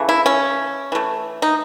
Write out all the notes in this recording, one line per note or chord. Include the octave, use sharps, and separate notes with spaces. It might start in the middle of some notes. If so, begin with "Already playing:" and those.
Already playing: C#3 E3 A3
E4
C#4
E3 A3
D#4